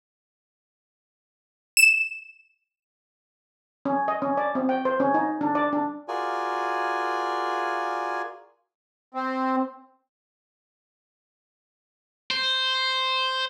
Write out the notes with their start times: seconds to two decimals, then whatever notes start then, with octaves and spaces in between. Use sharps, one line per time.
1.77 E7
3.85 C#4
4.08 D#5
4.22 C#4
4.37 D5
4.55 C4
4.69 G5
4.85 C5
5.00 C#4
5.14 D#4
5.41 D4
5.55 D5
5.73 D4
6.08 F4 F#4 G#4 A#4 D5 G#5
9.14 C4
12.31 C5